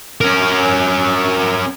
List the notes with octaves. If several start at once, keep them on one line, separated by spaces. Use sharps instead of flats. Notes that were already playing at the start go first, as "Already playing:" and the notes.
C#4 A#4